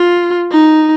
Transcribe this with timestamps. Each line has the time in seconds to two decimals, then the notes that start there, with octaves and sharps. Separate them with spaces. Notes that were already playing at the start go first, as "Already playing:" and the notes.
Already playing: F4
0.51 D#4